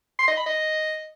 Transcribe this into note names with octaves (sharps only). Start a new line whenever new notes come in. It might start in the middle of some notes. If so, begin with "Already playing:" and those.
C6
D#5
B5
D#5